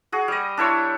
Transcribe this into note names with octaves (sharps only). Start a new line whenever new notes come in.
F#4 G#4
G3 D#5
D4 E4 C5 C#5